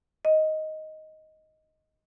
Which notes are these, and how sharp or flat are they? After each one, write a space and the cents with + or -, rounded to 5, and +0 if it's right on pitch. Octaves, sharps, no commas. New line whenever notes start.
D#5 +5